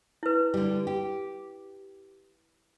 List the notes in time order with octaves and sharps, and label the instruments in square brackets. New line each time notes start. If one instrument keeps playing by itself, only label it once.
[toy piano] E4 B4
[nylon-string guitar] D3 G3
G4